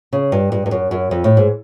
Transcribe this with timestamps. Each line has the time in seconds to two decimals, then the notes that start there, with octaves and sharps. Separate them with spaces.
0.13 C#3
0.32 G2
0.52 G2
0.66 G2
0.71 F#2
0.91 F#2
1.11 F2
1.24 A2
1.37 G#2